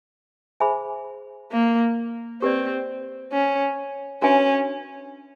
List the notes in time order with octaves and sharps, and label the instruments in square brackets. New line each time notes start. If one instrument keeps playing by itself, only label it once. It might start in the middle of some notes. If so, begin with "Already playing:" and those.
[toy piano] G#4 C5 E5 G#5 B5
[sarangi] A#3
[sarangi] C4 [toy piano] G4 B4 D5
[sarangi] C#4
[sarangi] C#4 [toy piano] D4 F#4 B4 E5 G#5